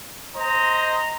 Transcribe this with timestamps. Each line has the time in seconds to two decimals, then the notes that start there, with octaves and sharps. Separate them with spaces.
0.35 C5 D#5 A#5